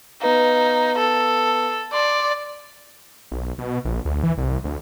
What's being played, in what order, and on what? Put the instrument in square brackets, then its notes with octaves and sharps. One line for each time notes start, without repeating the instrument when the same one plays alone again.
[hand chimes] B3 B4 F5 [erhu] D#4
[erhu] A4
[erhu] D5 [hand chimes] C6 D6
[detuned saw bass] B1
B2
A#1
D2
E3
C2
D2